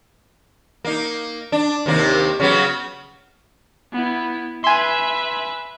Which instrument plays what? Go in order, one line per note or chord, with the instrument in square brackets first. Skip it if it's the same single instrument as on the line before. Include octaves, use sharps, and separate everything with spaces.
[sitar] A#3 D#4
D4
D#2 C3 A#3
C#3 F#3 B3
[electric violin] B3 E4
[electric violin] B4 E5 [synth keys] G#5 C6